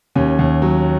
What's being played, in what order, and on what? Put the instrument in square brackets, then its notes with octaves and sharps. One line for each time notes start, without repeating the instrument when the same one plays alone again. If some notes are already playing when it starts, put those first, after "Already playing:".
[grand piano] D#2 C#4
D#2
F#3